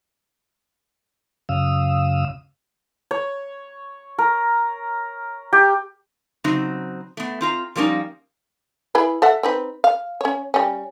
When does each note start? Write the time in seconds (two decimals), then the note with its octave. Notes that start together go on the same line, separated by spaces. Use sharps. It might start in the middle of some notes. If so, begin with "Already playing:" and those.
1.49 F#2 C#3 F5 D#6 E6
3.11 C#5
4.18 A#4
5.53 G4
6.44 C#3 F#3 C4 D#4
7.17 A3 B3
7.41 C4 F4 A#5
7.76 F3 G3 A#3 C#4 D#4
8.95 E4 G#4 B4
9.22 A4 E5 F#5
9.43 C4 D#4 B4
9.84 F5
10.21 C#4 C#5
10.54 G3 C#4